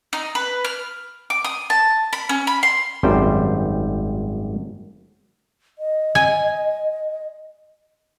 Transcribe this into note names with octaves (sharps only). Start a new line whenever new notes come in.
D#4
B4
F6
D6
D#6
A5
B5
C#4
B5
C6
G#1 F#2 G3 C5 G5
D#5
G#5